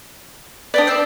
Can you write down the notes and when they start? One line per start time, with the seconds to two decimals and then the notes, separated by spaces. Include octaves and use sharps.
0.74 D4 B4 D5 G5 D#6
0.87 C5 E5 E6